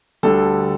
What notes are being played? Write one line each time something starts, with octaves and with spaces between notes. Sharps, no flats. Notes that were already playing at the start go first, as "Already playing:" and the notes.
D2 D3 G3 A4